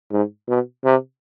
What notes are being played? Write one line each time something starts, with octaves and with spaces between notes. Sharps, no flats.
G#2
B2
C3